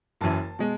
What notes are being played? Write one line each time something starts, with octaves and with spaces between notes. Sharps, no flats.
F#1 F#2 E3 A5
B2 G#3